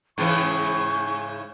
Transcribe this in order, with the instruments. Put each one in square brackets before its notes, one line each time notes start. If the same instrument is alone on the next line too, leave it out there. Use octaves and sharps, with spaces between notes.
[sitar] G#2 C#3 E3 [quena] C#6